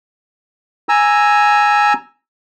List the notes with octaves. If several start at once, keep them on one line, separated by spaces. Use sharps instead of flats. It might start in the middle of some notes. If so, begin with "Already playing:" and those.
G#5 A#5 E6